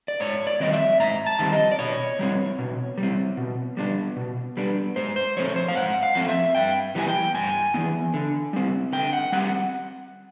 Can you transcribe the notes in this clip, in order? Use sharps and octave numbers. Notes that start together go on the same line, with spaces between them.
D5
G#2 C#5
D5
D#3 G3 C4 D#5
E5
G#2 A#5
A5
D#3 G3 C4
D#5
D5
B2 C#5
G3 C4
B2
G3
C4
B2
G3 B3 D4
B2
G3 B3 D4
G#2 C5
C5
F3 A3 C4 C#5
C5
F5
G#2 F#5
F5
F3 A3 C4
E5
G2 G5
E3 G3 B3 G#5
G5
G2 G#5
E3 G3 B3
D3
G3 C4
D3 G5
F#5
G3 C4 F#5